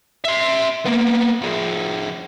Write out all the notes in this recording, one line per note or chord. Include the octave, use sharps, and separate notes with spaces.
E5 C6
A#3 B3
F3 G#4